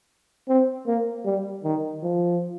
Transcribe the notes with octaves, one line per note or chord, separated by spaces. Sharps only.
C4
A#3
G3
D#3
F3